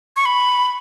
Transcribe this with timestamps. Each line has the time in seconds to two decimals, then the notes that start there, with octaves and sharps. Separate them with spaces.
0.16 C#6
0.26 B5